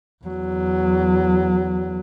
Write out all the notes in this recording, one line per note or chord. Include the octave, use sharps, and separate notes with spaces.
E2 F#3